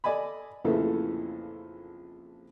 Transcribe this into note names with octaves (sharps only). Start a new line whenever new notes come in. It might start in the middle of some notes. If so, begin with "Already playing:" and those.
A4 D5 D#5 G#5 B5
A#1 F2 C#3 E3 A3 A4